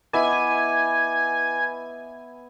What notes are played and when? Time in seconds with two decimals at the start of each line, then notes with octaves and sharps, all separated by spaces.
0.13 B3 E4 D#5 E5 G#5 D6 E6